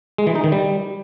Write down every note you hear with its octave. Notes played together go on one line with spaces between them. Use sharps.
G#3
E3
D#4
D#3
G3